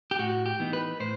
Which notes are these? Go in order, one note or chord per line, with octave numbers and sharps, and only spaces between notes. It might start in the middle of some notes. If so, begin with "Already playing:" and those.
G4
A2 F#4
G4
E3 B3 D#4
B4
A2 C5